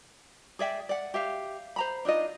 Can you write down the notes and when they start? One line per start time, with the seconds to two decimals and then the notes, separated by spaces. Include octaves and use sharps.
0.59 G#4 D5 E5 G5
0.89 D5 F#5
1.14 G4 E5 F5
1.76 C5 A#5 B5
2.05 D4 D#4 F4 D#5